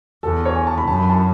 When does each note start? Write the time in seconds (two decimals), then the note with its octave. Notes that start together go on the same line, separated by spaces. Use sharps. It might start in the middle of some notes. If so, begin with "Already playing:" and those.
0.23 E2 A4
0.45 C#5
0.56 G#5
0.67 A5
0.78 B5
0.87 F#2 A5
0.98 B5
1.09 A5